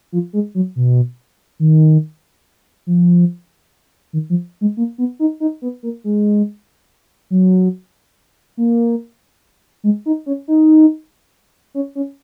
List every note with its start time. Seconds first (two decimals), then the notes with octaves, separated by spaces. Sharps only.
0.12 F3
0.33 G#3
0.55 F#3
0.76 B2
1.60 D#3
2.87 F3
4.13 D#3
4.30 F3
4.61 G#3
4.77 A#3
4.98 B3
5.19 D#4
5.40 D#4
5.62 B3
5.83 A#3
6.04 G#3
7.30 F#3
8.57 A#3
9.84 G#3
10.06 D#4
10.26 C#4
10.48 D#4
11.74 C#4
11.95 C#4